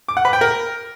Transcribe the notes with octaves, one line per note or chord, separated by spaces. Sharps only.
D6
F#5
B4
G5
A#4